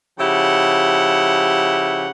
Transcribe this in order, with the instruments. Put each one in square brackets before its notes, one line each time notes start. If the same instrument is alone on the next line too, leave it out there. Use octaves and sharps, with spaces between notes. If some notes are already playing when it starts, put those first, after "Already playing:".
[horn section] C#3 F3 E4 G4 F#5